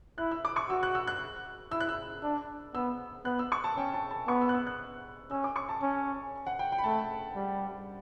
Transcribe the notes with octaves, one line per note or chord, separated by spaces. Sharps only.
E4 F#6
E6
D6
C#6
F#4 E6
F#6
E6
F#6
E4 E6
F#6
E6
D4
B3 E6
B3 F#6
E6
C#6
A5
C#4 G5
A5
A5
B3 C#6
E6
F#6
E6
F#6
C#4 E6
D6
C#6
A5
C#4
F#5
G5
G5
B5
A3 A5
G3